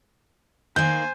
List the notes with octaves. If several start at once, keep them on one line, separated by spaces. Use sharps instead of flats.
D#3 A#3 C5 G#5 G6